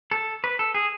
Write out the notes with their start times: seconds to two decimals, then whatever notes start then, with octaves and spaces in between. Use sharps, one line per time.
0.11 A4
0.44 B4
0.59 A4
0.74 G#4